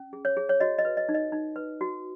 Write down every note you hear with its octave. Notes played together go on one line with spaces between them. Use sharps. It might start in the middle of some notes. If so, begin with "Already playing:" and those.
Already playing: C#4
G#4
C#5
G#4
C#5
F#4 D#5
D#5
B4
D#5
D#4
D#5
D#4
B4
F#4